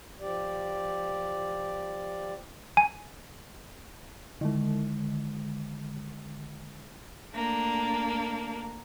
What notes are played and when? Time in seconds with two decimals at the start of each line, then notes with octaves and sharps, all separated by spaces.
0.20 F3 G4 D5
2.77 G#5
4.41 D3 D#3 G#3
7.32 A3 A#3 D4